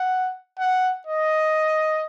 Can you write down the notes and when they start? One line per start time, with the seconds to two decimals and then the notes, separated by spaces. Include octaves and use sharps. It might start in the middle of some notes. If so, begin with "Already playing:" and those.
Already playing: F#5
0.59 F#5
1.07 D#5